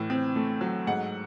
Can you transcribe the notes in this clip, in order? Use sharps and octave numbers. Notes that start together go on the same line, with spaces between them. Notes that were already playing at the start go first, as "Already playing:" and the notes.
Already playing: A2 E3
C4
A3
F#3
G#2 F#5